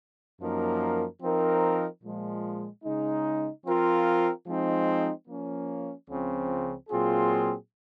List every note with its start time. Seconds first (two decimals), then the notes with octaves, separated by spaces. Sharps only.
0.40 F#2 F3 A#3 D#4 A#4
1.22 F3 C4 D#4 A#4
2.03 A#2 F3 G#3
2.84 C#3 G#3 D#4
3.65 F3 C4 F4 A#4
4.46 F3 G#3 C4 D#4
5.27 F3 A#3 C#4
6.08 C#2 C#3 F3 C4
6.89 A#2 F#3 C4 F4 G#4